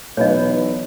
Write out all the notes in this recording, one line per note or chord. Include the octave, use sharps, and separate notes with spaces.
B1 E2 B4 C#5 D#5